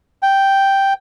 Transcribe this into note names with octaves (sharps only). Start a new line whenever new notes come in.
G5